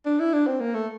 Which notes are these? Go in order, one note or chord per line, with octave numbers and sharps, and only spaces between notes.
D4
E4
D4
C4
A#3
A3